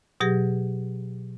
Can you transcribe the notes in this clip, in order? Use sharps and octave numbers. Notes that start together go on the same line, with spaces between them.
B2 F#3 G4 G#4 A#6